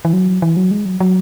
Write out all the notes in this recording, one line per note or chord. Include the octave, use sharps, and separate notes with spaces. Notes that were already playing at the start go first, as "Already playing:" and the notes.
E3
F#3
E3
F#3
G#3
F#3
F#3